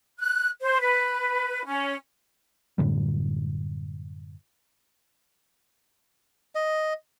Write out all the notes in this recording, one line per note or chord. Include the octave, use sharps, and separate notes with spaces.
F#6
C5
B4
C#4
F#2 A2 D3 G3
D#5